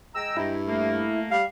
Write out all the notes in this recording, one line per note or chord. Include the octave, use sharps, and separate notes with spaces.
G#3 G5 A#5 E6
G2 E4
A3 A#3
G3 F5